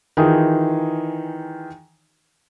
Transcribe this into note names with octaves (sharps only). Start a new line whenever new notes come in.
D#3 E3 D#4 F4 G#4